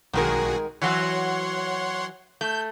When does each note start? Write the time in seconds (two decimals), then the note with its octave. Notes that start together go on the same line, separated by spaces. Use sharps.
0.13 B1 D#3 G#3 F#4 G#4 A#4
0.82 E3 F#3 F#4 C#5 F#5 C6
2.41 A3 G6